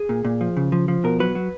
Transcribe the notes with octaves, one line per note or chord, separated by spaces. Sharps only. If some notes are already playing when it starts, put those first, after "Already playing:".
Already playing: G#4
A#2
A#2
F3
C#3
F3
F3
B2 A#4
F#3 B4
F#3